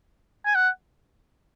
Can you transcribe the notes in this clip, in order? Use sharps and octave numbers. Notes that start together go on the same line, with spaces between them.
G#5
F#5